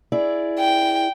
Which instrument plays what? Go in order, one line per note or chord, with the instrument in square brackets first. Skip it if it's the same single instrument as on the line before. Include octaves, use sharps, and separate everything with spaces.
[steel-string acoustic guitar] E4 G#4 D5
[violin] G5